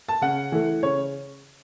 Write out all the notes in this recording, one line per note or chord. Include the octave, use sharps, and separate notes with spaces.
A5
C#3 F#5
E3 A3
C#3 C#5